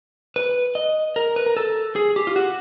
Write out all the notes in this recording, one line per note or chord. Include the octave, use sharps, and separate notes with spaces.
B4
D#5
A#4
B4
A#4
A4
G#4
G4
F4
F#4